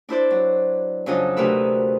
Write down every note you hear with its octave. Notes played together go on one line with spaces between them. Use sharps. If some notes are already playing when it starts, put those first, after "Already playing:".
D4 E4 C5 D5
F#3
F2 C#3 F#3 C#4 D4 D#5
D2 C3 D#4 A#4 B4 E6